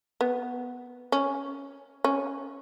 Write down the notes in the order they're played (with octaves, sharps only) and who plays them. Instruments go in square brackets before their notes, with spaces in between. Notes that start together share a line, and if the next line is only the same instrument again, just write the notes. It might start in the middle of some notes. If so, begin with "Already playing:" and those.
[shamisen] B3
C#4
C#4